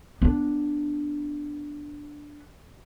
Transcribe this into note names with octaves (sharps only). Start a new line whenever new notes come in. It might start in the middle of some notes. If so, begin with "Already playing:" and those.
B3 D4